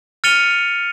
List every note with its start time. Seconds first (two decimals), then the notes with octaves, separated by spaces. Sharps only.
0.24 F6 A6 C#7 D#7 F7 G7